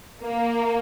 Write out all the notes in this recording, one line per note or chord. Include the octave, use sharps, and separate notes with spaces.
A#3